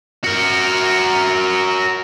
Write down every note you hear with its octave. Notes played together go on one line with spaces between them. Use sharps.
F#4 A#4